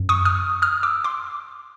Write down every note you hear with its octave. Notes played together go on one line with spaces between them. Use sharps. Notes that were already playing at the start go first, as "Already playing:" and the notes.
Already playing: F#2
C#6 D#6
D#6 F6
D#6 F6
D6 E6
C6 D6